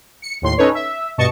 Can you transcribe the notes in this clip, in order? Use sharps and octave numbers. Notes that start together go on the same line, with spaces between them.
C#7
D#2 A2 C6 C7
C#4 D#4 A4 B4 C#5
E5
G2 B2 D#5 A5 C#6 C#7